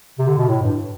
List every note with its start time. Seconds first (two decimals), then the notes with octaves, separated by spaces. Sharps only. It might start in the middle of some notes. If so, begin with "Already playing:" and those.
0.19 C3
0.28 D3
0.38 B2
0.48 A2
0.63 G2